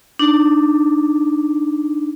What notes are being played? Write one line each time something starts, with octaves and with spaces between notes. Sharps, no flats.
D4 D#4